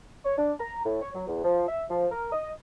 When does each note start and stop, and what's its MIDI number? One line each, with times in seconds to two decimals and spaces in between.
0.25 0.35 73
0.38 0.53 62
0.60 0.84 82
0.85 1.00 45
1.02 1.11 73
1.15 1.27 54
1.28 1.43 40
1.44 1.66 53
1.68 1.83 76
1.90 2.06 53
2.12 2.29 70
2.33 2.51 75